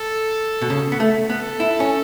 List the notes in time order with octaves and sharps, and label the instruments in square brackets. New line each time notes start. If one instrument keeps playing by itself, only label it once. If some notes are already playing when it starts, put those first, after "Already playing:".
Already playing: [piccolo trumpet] A4
[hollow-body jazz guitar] B2
C#3
B3
A3
[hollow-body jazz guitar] B3 [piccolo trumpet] A4
[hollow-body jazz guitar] E4
C#4